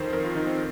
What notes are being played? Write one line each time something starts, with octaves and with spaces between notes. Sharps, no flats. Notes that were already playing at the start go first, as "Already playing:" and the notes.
Already playing: F2 D#3 C5
F2 A#4
F4
D#3 D#4
C4